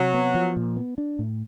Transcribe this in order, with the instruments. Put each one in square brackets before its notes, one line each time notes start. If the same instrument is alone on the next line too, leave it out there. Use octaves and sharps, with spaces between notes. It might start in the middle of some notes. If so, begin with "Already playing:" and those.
Already playing: [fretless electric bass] C3 [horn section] F#3
[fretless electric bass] B3
F3
A#2
B3
D4
A2